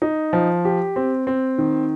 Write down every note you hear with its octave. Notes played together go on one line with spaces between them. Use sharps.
D#4
F3
G4
C4
C4
D#3